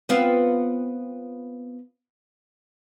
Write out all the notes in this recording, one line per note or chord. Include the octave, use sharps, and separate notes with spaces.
B3 C4 F4